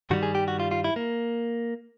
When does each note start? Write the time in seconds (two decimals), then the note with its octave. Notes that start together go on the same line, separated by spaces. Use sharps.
0.10 G2 D#3 G3 F#4
0.23 G#4
0.35 G4
0.48 F#4
0.60 F4
0.71 F4
0.84 E4
0.96 A#3